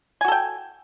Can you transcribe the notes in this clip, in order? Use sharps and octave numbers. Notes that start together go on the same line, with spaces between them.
F#4 A4 G5 G#5